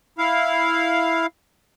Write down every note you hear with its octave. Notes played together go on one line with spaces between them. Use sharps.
E4 F5